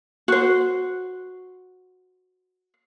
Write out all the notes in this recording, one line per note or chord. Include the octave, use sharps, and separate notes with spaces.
F#4 C5